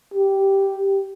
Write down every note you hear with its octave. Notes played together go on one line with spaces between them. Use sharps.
G4